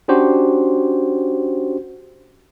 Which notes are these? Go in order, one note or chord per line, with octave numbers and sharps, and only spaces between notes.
C#4 D4 F#4 G4 C5